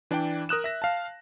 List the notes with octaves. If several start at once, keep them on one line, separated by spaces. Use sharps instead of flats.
E3 D4 E4 D5 G5
A#4 D#6 F#6 E7
E5 A#6
F5 A5